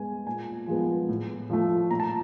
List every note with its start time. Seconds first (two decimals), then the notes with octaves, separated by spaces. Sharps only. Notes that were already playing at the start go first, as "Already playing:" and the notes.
Already playing: G#3 B3 G#5
0.26 A#2 G#5
0.67 F3 G#3 B3
1.09 A2
1.50 F3 A3
1.91 A#2 A#5
2.00 A5